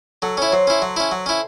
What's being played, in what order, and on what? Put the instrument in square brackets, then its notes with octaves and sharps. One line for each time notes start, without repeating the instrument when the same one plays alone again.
[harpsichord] F#3 [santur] A4
[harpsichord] C#4 E4 [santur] C#5
[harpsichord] F#3 [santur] C5
[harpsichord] C#4 E4 [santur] C5
[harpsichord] F#3
C#4 E4
F#3
C#4 E4